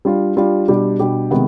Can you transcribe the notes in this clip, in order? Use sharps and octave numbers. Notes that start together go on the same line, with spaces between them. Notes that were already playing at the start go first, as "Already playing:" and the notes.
G3 D4 F4
G3 D4 F4
B2 G3 D4 G4
B2 G3 D4 G4
C3 D#3 G#3 B3